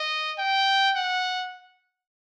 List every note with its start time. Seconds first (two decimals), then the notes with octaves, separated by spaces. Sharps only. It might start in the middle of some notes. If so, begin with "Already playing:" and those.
Already playing: D#5
0.39 G5
0.95 F#5